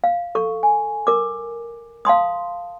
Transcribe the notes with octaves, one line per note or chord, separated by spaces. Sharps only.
F5
A4 C#6
G#5
A#4 D6
F5 A5 C6 D#6